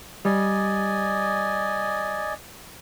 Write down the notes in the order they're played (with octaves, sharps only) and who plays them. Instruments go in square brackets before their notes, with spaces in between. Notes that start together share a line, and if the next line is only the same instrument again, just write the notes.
[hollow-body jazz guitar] G3 [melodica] D5 D#5 G#5